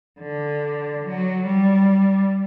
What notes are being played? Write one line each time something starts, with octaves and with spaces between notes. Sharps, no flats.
D3
F#3
G3